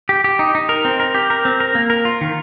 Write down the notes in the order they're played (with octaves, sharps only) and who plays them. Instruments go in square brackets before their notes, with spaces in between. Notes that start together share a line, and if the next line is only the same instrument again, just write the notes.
[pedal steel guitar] G4
G4
D#4
D#4
A#4
C4
A#4
G4
A#4
C4
A#4
A#3
A#4
F4
D#3